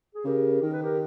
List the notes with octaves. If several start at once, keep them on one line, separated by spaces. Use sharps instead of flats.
G#4
C#3 G4 A#4
D#3 A#4
B4
G4 A#4